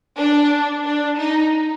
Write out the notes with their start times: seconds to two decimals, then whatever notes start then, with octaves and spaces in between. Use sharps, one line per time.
0.17 D4
0.85 D4
1.18 D#4